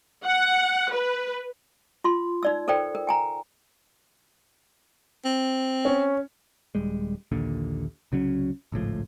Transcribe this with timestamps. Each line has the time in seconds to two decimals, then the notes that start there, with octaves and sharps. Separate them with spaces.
0.25 F#5
0.92 B4
2.04 F4 C6
2.43 D#4 D5 E6
2.68 A4 A#4 C5 D5 G5
2.95 A#4
3.07 G5 G#5 A#5
5.25 C4
5.85 C#4
6.75 D#1 G3 G#3
7.32 A#1 D#2 A#2 D3
8.12 C2 C#3 F#3 C#4
8.72 G#1 C#2 A2 F3